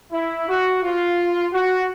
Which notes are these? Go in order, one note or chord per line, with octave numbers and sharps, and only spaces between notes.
E4
F#4
F4
F#4